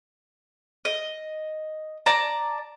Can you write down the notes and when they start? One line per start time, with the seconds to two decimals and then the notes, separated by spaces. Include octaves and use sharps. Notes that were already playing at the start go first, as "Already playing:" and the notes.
0.85 D#5
2.06 D5 A5 A#5